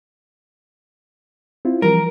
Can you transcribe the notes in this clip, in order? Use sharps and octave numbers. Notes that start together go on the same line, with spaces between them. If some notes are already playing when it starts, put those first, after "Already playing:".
C4 E4 F4
E3 F3 G3 A#4